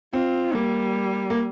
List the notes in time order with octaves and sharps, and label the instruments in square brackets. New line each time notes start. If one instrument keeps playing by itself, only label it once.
[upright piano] C4 [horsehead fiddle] F4
[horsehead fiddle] G3 [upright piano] A#3
[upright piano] A#3